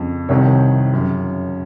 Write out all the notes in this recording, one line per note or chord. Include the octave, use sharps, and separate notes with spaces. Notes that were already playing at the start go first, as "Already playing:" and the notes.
Already playing: F2 C#3
C2 C3 D#3 C#5
F#2 C#3